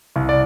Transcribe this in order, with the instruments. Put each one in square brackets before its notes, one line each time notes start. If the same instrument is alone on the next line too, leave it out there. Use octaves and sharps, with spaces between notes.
[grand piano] C2
D5